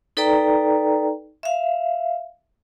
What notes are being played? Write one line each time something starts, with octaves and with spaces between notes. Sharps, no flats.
D#4 A4 B4 D5 G5 A#5
E5 F5